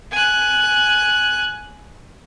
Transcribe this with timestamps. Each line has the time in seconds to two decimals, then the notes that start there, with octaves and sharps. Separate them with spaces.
0.11 G#5 F#6